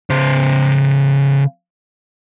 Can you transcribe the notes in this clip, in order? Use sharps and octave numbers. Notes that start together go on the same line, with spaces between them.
C#3 C5